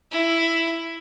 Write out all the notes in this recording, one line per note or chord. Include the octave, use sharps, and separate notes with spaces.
E4